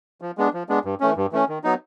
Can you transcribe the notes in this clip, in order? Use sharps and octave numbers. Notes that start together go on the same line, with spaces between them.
F3
G#3 B3 D4
F3
G#3 B3 D4
G2
E3 A3 C#4
G2
E3 A3 C#4
D#3
F#3 B3 D#4